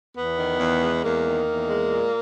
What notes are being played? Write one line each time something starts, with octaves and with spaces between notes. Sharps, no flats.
E2 B3
D#3
E2
G#3
E2 A#3
D#3
E2
G#3
A#2